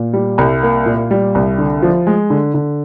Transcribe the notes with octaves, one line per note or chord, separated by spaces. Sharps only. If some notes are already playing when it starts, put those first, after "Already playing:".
Already playing: A#2
G3
C2
A#3
A#2
G3
C2
D3
F3
G#3
D3
D3